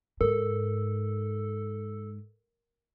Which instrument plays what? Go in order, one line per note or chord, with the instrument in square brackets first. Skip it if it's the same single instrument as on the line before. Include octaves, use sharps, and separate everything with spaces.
[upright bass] G#2 [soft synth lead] A4 [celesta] A#4